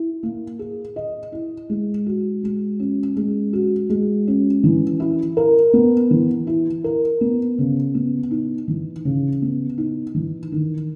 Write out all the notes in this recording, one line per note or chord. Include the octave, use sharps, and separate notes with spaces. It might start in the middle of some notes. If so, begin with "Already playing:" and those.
Already playing: E4
A#3
G#4
D#5
E4
G#3
F#4
G#3
C#4
G#3
F#4
G#3
C#4
E3
E4
A#4
B3
E3
E4
A#4
B3
C#3
B3
D#4
E3
C#3
B3
D#4
E3
D#3